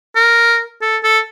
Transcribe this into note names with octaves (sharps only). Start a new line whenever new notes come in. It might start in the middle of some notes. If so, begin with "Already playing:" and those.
A#4
A4
A4